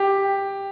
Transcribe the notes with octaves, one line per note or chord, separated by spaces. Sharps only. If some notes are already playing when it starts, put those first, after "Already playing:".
Already playing: G4